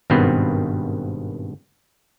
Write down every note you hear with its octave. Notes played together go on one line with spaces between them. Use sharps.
G#1 G2 B2 D#3 B3 C4